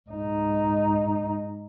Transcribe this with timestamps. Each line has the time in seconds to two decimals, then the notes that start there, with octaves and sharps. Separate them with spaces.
0.10 G#2 D#4